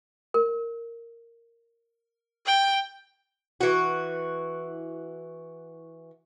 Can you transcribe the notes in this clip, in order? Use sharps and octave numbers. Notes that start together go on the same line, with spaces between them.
A#4
G5
E3 F#4